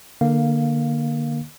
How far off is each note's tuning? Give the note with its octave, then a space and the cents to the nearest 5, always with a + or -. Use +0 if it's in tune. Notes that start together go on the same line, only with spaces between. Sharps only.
D3 +25 A#3 +10 F5 +0